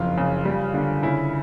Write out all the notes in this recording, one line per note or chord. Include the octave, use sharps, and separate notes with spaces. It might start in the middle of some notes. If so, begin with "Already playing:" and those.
Already playing: F#1 F2 F4
C#3
G3
D3
C#3 E4